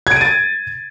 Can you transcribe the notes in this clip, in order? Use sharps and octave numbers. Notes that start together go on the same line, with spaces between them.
G#6 A6 D7 D#7